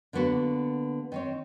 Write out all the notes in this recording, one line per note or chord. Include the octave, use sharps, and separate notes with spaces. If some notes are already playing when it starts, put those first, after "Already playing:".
D3 A#3 B3 F#4
D#3 C4 C#5